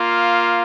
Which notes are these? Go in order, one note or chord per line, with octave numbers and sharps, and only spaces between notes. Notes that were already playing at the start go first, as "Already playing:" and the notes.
Already playing: A#3 F4